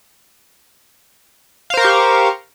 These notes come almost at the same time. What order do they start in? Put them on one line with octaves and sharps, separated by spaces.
F5 C5 A#4 C#6 G4